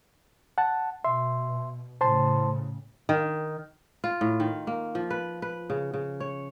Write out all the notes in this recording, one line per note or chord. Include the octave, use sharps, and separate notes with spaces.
F#5 A5
B2 E5 C6
A2 C#3 C5 A5 C6
D#3
F4
A2
D#3
A#3
F3
B4
B4
C#3
C#3
C#5